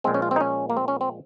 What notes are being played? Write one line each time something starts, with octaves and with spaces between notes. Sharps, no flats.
A#2 F3 G#3 C4
C#4
F4
C4
D#4
C#4
A#3
C4
C#4
C4